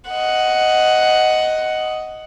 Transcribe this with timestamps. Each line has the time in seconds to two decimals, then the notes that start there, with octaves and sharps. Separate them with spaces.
0.10 D#5 F#5